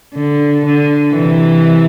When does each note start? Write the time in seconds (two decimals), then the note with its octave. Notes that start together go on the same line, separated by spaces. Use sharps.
0.15 D3
0.65 D3
1.16 C3 E3